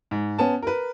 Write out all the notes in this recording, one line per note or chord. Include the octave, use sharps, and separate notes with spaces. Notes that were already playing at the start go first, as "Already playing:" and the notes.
G#2
B3 C#4 A5
A#4 B4